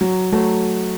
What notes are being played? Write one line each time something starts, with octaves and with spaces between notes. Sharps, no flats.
F#3
F#3 A3